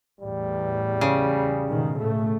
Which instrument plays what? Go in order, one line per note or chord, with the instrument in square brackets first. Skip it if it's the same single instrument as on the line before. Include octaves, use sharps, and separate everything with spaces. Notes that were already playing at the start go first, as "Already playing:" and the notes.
[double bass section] E2 A2 [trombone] G3
[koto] C#3
[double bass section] G#2 B2 D#3
A2 A3